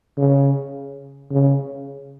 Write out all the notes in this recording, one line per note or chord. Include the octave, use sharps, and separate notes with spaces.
C#3
C#3